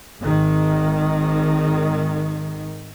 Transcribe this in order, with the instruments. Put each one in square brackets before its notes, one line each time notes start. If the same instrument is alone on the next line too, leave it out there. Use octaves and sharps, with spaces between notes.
[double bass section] G#1 D#3